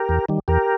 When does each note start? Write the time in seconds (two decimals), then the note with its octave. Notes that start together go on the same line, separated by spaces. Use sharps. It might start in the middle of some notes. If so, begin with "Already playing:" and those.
Already playing: G4 A#4
0.09 E2
0.29 D#3 G3
0.48 E2 G4 A#4